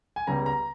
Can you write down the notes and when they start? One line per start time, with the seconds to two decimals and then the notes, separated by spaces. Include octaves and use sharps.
0.16 G#5
0.27 C#2 C#3 G3 B3 A#5
0.46 A#5